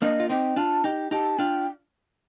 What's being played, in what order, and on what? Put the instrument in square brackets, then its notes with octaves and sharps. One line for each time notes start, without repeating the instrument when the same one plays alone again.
[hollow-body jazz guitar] A#3 D4 [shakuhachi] D#5
[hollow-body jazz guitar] F4
[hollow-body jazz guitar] C4 D#4 [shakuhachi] G5
[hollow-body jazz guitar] D4 F4 [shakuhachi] A5
[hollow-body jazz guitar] D#4 G4 [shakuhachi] G5
[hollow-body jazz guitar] D#4 G4 [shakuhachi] A5
[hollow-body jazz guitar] D4 F4 [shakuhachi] G5